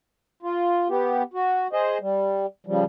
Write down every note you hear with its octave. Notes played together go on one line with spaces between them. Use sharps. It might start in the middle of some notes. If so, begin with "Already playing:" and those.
F4
B3 G4
F#4
G#4 C5 D#5
G3
C#3 F3 G3